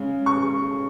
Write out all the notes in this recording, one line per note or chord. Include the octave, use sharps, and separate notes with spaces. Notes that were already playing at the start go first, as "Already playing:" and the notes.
Already playing: C#3 G#3 C#4
C#6